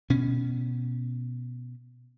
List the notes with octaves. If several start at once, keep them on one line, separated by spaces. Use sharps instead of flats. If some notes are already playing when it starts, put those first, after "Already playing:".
B2 C#4